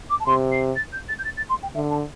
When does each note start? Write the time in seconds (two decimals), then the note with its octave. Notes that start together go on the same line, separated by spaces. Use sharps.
0.10 D6
0.20 A5
0.26 C3 C6
0.52 C7
0.76 A6
0.93 G6
1.09 A6
1.19 G6
1.25 A6
1.37 A6
1.49 C6
1.63 G5
1.74 D3 E5
1.90 A5